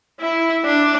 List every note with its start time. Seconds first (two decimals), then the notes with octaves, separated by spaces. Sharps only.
0.20 E4
0.64 D4